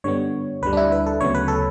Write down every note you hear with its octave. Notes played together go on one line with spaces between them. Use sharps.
G2 D3 G3 B3 C#5
D2 D3 G3 B4
D4
E4
B4
A4
D2 C#3 F#3 B3 C#5
B4
A4